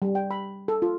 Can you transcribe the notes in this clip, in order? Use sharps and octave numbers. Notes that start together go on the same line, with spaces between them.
G3
G5
B5
A4
F4